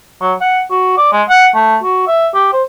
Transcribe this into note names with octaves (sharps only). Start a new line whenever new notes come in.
F#3
F#5
F#4
D5
G#3
F#5
A3
F#4
E5
G4
C5